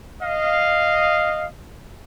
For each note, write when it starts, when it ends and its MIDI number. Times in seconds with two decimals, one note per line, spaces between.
0.22 1.46 75
0.22 1.46 77